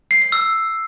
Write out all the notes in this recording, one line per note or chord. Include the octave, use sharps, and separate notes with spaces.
C7
C7
E6